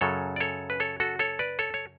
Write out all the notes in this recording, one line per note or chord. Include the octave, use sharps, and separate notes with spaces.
F#2 C#3 F#3 A4 C#5
D5
A4 C#5
B4
A4 C#5
F#4 A4
A4 C#5
B4 D5
A4 C#5
C#5